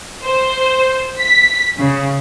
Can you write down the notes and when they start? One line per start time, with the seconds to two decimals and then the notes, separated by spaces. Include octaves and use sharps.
0.23 C5
1.20 B6
1.77 C#3